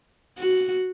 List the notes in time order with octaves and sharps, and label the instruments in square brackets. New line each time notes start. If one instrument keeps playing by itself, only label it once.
[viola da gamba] F#4